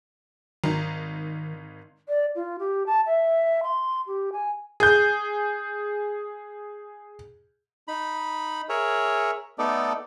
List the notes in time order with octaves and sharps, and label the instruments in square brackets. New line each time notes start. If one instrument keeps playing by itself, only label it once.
[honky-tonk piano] G#1 D#4 [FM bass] D#3
[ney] D5
F4
G4
A5
E5
C6
G4
G#5
[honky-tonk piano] G#4 G6
[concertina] D#4 B5
G#4 A#4 C#5 E5
A3 B3 D#4 A4 D5